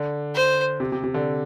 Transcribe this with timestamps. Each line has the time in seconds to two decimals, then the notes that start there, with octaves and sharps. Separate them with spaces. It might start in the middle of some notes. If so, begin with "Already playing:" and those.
Already playing: D3
0.35 C5
0.80 C3
0.92 C3
1.04 C3
1.14 D3